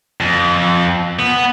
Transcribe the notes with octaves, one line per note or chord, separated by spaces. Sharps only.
F2
B3